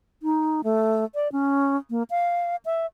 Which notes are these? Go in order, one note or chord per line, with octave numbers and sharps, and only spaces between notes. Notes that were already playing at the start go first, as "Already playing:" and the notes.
D#4
A3
D5
C#4
A#3
F5
E5